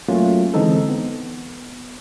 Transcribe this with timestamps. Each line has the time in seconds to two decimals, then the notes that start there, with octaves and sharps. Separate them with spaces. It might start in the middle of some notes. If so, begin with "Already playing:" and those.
0.09 F#3 A3 A#3 C#4 F4
0.54 D3 E3 G#3 C4 D#4 A4
0.89 B3